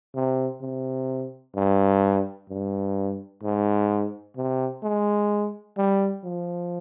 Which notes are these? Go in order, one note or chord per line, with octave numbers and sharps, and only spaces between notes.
C3
C3
G2
G2
G#2
C3
G#3
G3
F3